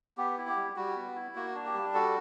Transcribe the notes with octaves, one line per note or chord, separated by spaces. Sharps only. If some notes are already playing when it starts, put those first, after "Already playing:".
B3 G4
E4
G4
G3
G3 F#4
B3
E4
A#3 F#4
D4
G4
G3
F#4 A4